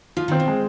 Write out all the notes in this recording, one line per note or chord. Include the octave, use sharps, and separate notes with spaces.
F3 F4
D#3
C4
B2
G#3